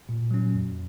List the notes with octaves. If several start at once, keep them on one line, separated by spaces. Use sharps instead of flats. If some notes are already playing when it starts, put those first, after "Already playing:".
A#2
F#3 C#4
F2